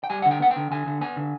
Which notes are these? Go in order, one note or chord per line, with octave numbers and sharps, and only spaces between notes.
G5
G3 G#5
F#5
D3
G5
B3 F#5
G5
D3
D3 G#5
D3
B3 G#5
D3